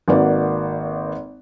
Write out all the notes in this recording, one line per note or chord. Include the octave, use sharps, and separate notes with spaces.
G#1 A#3 F#4 B4 D5